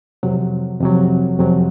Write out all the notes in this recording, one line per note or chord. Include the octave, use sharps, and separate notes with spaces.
F2 C3 F#3
F2 C3 F#3
F2 C3 F#3